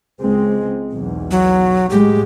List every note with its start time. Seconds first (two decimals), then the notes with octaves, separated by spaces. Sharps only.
0.19 C#2 G#3 C4
0.92 B1 E2
1.31 F#3
1.90 A2 G#3 G4